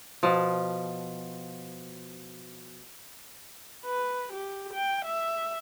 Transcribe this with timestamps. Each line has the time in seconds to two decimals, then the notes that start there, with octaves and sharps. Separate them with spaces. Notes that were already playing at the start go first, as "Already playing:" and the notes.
0.23 B2 F3
3.85 B4
4.33 G4
4.74 G5
5.05 E5